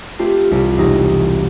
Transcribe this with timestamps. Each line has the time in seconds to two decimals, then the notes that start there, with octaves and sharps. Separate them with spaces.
0.19 A3 C4 F4 G4 A4
0.51 C2
0.77 E1 C4 D#4 A#5